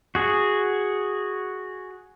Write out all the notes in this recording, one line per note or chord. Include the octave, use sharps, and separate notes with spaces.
F#4 G#4